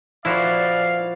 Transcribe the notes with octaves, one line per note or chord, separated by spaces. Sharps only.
A#2 F3 E4 F#4 B4 D5 F5